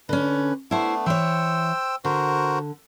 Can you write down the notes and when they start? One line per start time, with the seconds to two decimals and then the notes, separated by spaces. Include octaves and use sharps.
0.09 D3 C#4 B4
0.71 A3 B3 D4 E4 C5
1.06 E3 C5 C#5 G5 E6
2.05 D3 F#4 A#4 C5